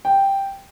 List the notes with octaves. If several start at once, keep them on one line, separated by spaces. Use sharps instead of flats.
G5